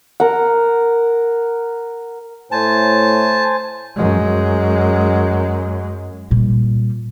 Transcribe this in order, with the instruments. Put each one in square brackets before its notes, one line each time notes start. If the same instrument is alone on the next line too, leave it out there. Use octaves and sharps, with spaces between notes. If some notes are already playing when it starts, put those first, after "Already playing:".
[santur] A#4 F#5
[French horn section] A2 A3 C#5 [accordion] C5 G#5 [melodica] A5
[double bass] F#2 G#3
[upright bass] A#2 G3